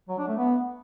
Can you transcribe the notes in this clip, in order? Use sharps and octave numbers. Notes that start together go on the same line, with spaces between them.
F#3
D4
A3
B3